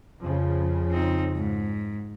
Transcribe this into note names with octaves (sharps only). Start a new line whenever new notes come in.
F2 C#3 F3
C4 D#4
G#2